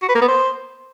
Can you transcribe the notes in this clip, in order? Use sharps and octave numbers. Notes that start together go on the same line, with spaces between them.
F#4
B4
A#3
B3
C5